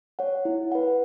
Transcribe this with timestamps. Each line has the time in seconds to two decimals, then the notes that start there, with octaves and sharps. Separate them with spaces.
0.19 C#5 F#5
0.45 E4
0.72 B4 F#5